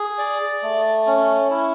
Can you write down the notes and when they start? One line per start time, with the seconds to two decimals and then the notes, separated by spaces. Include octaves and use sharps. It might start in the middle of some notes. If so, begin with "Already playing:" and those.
Already playing: G#4
0.18 D5
0.63 A3
1.07 C#4
1.50 E4